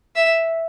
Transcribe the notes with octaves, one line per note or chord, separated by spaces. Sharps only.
E5